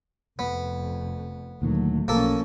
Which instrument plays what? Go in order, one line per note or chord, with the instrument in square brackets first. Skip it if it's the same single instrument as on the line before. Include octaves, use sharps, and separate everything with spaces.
[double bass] F1 F2 [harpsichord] B3
[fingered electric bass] D2 A#2 D#3 [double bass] F#3 A3
[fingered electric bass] B1 [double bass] F3 C#4 [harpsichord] A#3 A4